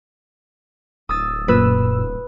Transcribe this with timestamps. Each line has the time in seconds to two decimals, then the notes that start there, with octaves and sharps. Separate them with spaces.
1.09 D1 D#6 E6 A6
1.48 F#2 A#2 B4 E6